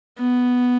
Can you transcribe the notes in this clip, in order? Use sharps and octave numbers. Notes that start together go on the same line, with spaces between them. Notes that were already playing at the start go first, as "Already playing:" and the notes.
B3